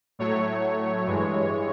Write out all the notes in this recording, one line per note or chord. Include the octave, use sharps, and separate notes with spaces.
A2 F#3 A3 C#5
G2 E3 G#3